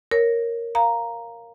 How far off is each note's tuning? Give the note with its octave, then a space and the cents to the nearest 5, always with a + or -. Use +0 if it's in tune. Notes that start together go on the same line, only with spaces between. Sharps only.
A#4 +0 C#5 +0
F5 +0 A#5 +0